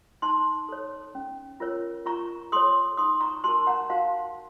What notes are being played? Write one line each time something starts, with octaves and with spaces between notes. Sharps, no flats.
D#4 A5 C6
A4 C#5
C#4
F4 A#4 C#5
F4 A#5 C#6
A4 C#5 C6 D#6
D#4 C6 D#6
A#5 C#6
F#4 A#4 A5 C6
F#5 A#5
F#4 F5 A5